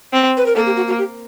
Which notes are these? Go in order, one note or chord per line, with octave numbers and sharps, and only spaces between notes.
C4
B4
A#4
A#3 A4
G4
F#4
F#4
G4